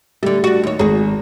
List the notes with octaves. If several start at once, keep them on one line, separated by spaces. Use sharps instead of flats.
D3 G3 A3
D4 F#4
D#2 C#5
G#1 F#4 G#4